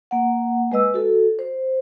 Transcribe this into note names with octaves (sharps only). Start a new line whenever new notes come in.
A#3 F#5
G#3 B4 D#5 E6
F#4 A4
C5